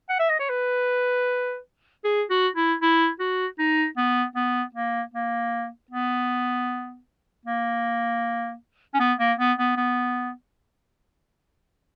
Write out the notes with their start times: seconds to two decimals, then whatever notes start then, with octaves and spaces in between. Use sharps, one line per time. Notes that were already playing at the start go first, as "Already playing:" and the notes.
0.09 F#5
0.19 E5
0.30 D#5
0.39 C#5
0.49 B4
2.04 G#4
2.30 F#4
2.56 E4
2.82 E4
3.20 F#4
3.59 D#4
3.97 B3
4.36 B3
4.75 A#3
5.14 A#3
5.91 B3
7.45 A#3
8.94 C#4
9.00 B3
9.19 A#3
9.39 B3
9.58 B3
9.77 B3